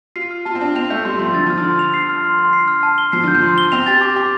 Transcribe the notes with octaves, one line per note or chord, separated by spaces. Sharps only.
F4 C7
F6
F4 A5
C4
D4 A5
C4 F7
A3 G6
G3 C6
F3 C6
D3 A6
F3 F6
D3
C6
F7
C7
F6
C6
C6
C7
F6
A5
G7
F3 C7
D3 G6
F3
C6
G7
C4 F7
G4 A6
G4 D6
G4 D6